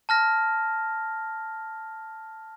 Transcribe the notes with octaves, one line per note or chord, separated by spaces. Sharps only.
A5 F6 A#6